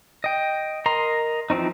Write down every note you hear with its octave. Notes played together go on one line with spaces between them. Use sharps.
D#5 G5
A#4 D#5 A#5 C6
E3 F3 C4 C#4 D#4